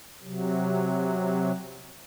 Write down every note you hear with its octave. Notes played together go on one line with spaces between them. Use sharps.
C3 F#3